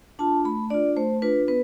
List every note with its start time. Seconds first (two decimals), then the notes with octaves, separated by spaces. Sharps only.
0.19 D4 F4 A5
0.45 A3 B5
0.70 D4 F4 D5
0.96 A3 C5
1.22 D4 F4 B4
1.48 B3 B4